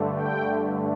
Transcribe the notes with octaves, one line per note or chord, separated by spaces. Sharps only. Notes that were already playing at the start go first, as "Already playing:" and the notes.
Already playing: G2 D3 A3
G5